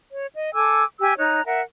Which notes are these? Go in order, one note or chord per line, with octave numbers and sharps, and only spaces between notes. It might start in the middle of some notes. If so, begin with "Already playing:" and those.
C#5
D#5
A4 G#5 D6 E6
G4 G#5 E6
D#4 C#5 A#5 F#6
A#4 E5 F#5